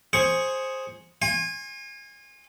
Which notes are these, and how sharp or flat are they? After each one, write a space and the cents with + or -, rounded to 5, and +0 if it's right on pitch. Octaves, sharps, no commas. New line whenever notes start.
G#4 +0 C5 +10 C#6 +5
G#5 -25 C6 +35